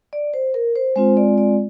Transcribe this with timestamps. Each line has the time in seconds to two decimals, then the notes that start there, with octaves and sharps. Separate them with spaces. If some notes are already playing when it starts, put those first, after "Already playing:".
0.13 D5
0.34 C5
0.54 A#4
0.76 C5
0.96 G#3 C4 F4 C5
1.17 D5
1.38 D5